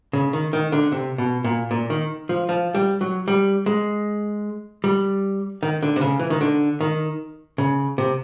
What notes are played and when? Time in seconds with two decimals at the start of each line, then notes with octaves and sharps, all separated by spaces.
0.13 C#3
0.33 D#3
0.53 D#3
0.72 D3
0.92 C3
1.18 B2
1.44 A#2
1.71 A#2
1.90 D#3
2.29 F3
2.49 F3
2.75 G3
3.01 F#3
3.28 G3
3.66 G#3
4.84 G3
5.63 D#3
5.83 D3
5.96 C3
6.01 C#3
6.20 E3
6.30 D#3
6.41 D3
6.81 D#3
7.58 C#3
7.98 C3